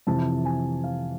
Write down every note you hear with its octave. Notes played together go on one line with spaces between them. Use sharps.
F2 C3 E3 A5
G#5
F5